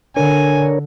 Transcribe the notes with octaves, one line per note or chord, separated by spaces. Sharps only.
D3 D4 A#4 C#5 G#5